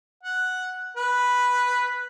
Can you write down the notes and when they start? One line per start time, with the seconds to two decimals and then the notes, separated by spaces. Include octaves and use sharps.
0.23 F#5
0.97 B4